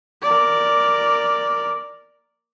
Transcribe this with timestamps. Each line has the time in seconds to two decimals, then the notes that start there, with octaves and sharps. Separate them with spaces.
0.22 A#4 D5